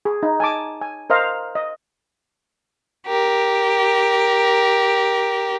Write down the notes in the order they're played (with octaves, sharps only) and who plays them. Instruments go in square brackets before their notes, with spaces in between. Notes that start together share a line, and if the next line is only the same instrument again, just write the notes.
[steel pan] G#4
D#4
G#5 A5 D6
G#5
A#4 C5 D#5 F5 A#5
D#5
[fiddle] G4 A#4